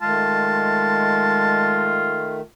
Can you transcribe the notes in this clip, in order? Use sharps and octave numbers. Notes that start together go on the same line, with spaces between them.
D#3 G#3 A3 F4 A5